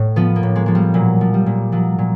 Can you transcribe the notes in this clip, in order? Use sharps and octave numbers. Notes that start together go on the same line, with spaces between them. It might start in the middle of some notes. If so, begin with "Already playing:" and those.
Already playing: A2
F3 B3
A#3
A2
G#3
F3 G#3
G3
A#2 F#3
F3
G3
A#2
F3 F#3
A#2